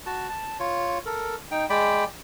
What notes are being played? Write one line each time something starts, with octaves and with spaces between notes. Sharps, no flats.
F#4 A5
A5
F4 C#5
A4 A#4
D#4 G5
G#3 D5 G5 B5